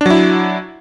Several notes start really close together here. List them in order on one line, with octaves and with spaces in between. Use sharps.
D4 F#3 E4